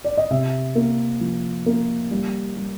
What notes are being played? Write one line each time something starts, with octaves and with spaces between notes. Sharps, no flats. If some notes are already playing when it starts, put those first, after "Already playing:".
D5
D#5
C3 E5
A#3
F3
A#3
G3
G3